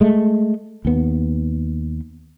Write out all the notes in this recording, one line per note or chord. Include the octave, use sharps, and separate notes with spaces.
G#3 A3
D#2 B3